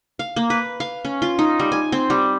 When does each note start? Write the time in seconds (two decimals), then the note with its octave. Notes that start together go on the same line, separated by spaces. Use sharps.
0.19 F5
0.36 A#3
0.50 B4
0.80 F5
1.05 C#4
1.22 F4
1.39 D#4
1.59 G3
1.72 G#5
1.92 C4
2.10 G3